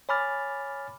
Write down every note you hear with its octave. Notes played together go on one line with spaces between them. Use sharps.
C#5 G#5 B5 D6 F6 A6